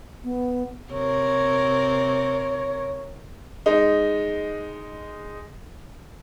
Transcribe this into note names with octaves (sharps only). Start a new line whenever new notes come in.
B3
C3 C4 A#4 C#5
G#3 D#4